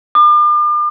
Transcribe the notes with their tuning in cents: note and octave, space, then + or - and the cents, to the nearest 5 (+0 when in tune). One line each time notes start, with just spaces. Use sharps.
D6 +40